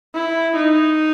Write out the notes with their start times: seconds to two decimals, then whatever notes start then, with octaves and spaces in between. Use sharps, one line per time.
0.14 E4
0.56 D#4